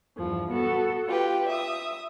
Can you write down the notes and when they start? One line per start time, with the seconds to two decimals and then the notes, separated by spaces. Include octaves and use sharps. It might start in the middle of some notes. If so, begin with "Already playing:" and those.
0.17 E2 G2 F3
0.50 B3 F#4 A4
1.06 F4 G4 B4
1.48 E5 D#6